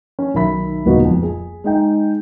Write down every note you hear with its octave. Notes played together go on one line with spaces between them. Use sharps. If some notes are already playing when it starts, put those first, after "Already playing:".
C#4
B1 D#3 E5 B5 B6
D#1 C#2 B3 D#4 F#4 D#5
F2
G#4
G#3 D#4 G5